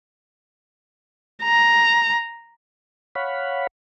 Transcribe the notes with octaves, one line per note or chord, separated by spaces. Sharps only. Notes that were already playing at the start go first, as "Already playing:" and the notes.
A#5
C#5 F5 F#5 B5